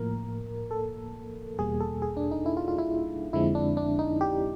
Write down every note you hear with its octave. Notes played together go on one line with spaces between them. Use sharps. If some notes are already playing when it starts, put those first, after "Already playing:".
Already playing: A2 F3 A#3 A#4
A4
E2 B2 G3 A#3 G#4
A4
G#4
D4
D#4
E4
F4
F4
E4
F2 D3 F3 G#3 C4 E4
D4
D4
D#4
G4